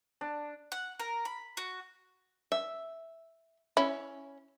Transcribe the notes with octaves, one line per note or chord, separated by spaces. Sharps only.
D4
F#5
A#4
B5
F#4
E5
C#4 E4